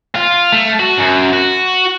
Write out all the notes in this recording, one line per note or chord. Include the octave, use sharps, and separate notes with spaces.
F4
A3
F#4
F#2
F#4